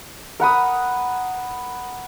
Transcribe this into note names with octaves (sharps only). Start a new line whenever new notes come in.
A#4 F#5 B5 D#6